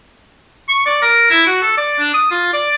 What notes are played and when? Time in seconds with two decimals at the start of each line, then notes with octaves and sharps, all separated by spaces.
0.69 C#6
0.86 D5
1.02 A#4
1.31 E4
1.47 F#4
1.62 A4
1.78 D5
2.00 D4
2.14 D#6
2.31 F4
2.53 D5